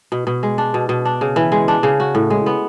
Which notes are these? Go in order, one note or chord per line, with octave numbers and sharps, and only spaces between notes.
B2
B2
G#3
D4
B2
B2
D4
C#3
E3
G#3
D4
C#3
F#4
A2
G#3
B3